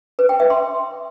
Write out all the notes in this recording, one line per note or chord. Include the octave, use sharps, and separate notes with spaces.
B4
G5
E5
C6